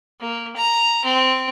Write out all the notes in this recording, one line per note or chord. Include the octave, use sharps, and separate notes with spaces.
A#3
A#5
C4